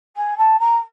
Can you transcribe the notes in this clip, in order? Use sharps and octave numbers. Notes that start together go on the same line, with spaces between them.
G#5
A5
A#5